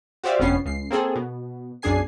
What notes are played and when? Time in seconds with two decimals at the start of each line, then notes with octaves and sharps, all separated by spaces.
0.24 F#4 G4 C5 D5 E5 F5
0.39 G1 F2 C3 B3 C#4 C7
0.65 C#2 C7
0.91 A#3 C4 G#4 A4
1.15 B2
1.82 B1 F#2 D4 G#4 G#5 C7